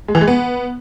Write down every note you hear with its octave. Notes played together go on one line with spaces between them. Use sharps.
G#3
E3
G#3
B3